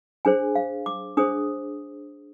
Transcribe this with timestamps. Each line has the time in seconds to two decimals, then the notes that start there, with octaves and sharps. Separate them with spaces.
0.25 D4 G#4 C5 G#5
0.55 F5
0.86 D6
1.17 D4 G#4 C5 D#6